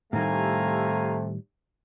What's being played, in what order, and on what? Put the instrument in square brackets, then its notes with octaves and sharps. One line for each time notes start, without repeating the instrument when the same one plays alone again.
[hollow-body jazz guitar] A2 D#3 G3 [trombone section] C3 A3 [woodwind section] F5 G#5 A#5